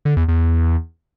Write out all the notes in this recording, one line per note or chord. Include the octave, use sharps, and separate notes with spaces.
D3
E2
E2